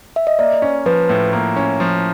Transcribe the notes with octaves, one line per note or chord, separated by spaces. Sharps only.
E5
D#5
A#3 D5
C#4
F3 B4
A2
A#3
C#4
F3